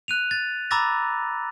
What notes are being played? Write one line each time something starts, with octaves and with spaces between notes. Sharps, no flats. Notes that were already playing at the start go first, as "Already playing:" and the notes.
F#6 D#7 F7
A6
A#5 B5 D6 E6 A6 A#6